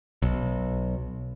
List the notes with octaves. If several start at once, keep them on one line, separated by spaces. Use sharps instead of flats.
B1